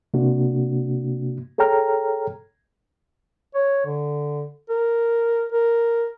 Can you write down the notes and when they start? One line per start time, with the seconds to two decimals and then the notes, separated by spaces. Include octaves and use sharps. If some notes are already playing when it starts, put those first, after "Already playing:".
0.14 C3 A#3 D4 F#4
1.58 G#4 A4 C#5 G5 A#5 F6
3.55 C#5
3.86 D3
4.69 A#4
5.53 A#4